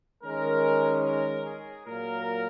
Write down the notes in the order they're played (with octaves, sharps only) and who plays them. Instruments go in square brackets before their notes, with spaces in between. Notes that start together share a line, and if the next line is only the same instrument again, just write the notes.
[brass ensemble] D#3 G#3 C#4 A#4
A#4
G#4
A#2 F#3 A#3 A#4